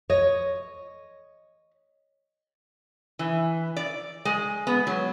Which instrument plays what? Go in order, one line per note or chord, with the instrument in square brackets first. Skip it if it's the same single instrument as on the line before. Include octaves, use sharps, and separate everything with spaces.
[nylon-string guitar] C#5 D#5
[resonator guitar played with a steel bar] E3
D5
G#3
B3
F#3